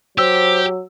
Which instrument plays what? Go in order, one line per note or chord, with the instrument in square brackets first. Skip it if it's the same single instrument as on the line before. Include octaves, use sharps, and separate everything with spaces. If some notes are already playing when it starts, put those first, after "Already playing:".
[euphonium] F#3 [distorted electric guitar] G4 [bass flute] C5 [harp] E6